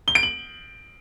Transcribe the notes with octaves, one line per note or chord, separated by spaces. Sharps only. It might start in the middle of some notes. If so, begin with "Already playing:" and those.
G7
D7
F#7